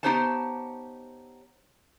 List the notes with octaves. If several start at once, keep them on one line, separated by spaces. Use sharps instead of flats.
B3 D#4 G4 C5 C#5 A5